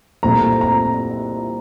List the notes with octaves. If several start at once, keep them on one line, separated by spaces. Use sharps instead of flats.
C2 A#2 A3 C4 A#5
A#5